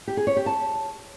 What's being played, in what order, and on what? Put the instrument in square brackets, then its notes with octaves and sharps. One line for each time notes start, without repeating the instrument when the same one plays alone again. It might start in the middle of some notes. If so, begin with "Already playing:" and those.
[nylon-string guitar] G4
G#4
C#5
G4
A5